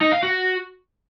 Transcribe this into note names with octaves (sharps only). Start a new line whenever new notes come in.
D#4
F5
F#4